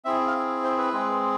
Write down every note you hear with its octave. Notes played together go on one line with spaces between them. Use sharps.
C4 E4 G#4 E5
F5
C5
B4
G#3 C4 G#4